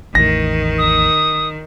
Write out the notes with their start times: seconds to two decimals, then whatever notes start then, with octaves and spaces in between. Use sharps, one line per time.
0.15 A1 E2 A2 D#3 A#6
0.78 D#6